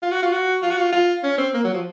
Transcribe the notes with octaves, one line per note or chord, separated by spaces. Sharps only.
F4
F#4
F4
F#4
F4
F#4
F4
F4
C#4
C4
A#3
F#3
F3